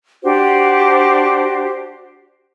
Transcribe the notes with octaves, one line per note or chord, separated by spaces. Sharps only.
D4 F#4 G4 C5